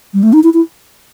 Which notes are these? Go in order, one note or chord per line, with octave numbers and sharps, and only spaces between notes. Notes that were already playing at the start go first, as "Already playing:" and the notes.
G3
A3
D#4
E4
E4